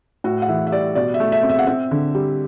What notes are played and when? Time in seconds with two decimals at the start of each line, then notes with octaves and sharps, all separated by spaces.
0.24 A2 F#4
0.42 F#5
0.48 E3 E5
0.67 E5
0.72 G3 D5
0.95 B2 D5
1.14 E5
1.20 A3
1.32 E5
1.43 C4
1.49 E5
1.59 F#5
1.67 C4 E5
1.91 D3
2.15 G3